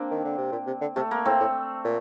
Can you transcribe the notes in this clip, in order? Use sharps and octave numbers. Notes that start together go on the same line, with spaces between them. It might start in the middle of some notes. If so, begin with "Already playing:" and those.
Already playing: A#3 C4 D4
D#3
D3
C3
A#2
C3
D3
C3 A3
A#3
A2 A3 C4
A2
A#2